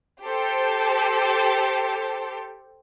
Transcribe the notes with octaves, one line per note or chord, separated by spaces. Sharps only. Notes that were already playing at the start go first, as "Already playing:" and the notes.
G4 A4 C5